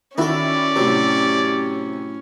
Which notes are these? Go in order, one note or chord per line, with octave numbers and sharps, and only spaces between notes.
D#3 C#4 E4 F#4 A4 D5
A2 C3 F#3